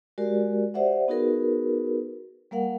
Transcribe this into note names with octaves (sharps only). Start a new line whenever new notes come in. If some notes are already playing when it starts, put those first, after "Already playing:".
G#3 F#4 G4 A#4 D5
G4 C5 D5 E5 F#5
B3 D#4 F#4 G#4 A#4 B4
G3 A#3 A#4 F5 F#5